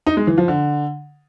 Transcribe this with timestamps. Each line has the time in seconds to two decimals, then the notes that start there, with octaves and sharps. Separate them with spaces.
0.07 D#4
0.17 G#3
0.27 E3
0.38 F3
0.48 D3